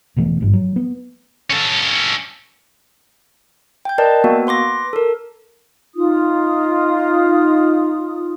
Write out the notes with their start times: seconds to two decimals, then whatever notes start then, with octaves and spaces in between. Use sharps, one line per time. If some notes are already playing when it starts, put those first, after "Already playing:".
0.16 E1 B2 E3 A3
0.41 G#1 G2
0.53 F#3
0.76 B3
1.51 C#4 A4
3.85 G5 G6
3.98 A#4 B4 D5 D#5 G5 A5
4.24 A#3 B3 F#4
4.47 B4 C6 D6 A#6
4.93 A4 A#4
5.94 D#4 F4 D#6